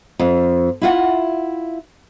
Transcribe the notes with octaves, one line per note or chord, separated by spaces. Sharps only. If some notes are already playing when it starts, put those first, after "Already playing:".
F2
E4 F4 F#5